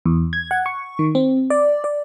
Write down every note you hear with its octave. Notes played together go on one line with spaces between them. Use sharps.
E2
G#6
F#5
C#6
D#3
C4
D5
D5